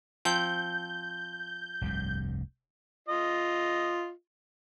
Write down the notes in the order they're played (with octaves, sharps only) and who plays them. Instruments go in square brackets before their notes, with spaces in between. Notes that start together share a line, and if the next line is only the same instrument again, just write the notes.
[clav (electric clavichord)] F3 C4 [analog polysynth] G6
[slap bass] F1 C2 G2
[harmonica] F4 D#5